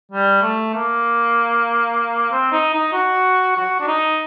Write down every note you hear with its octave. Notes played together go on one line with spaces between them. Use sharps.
G3
A3
A#3
C4
D#4
D#4
F#4
F#4
D4
D#4